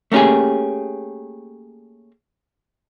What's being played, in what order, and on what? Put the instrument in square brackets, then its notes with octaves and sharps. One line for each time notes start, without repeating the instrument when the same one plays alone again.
[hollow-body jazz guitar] A3 A#3 C#4 G4 G#4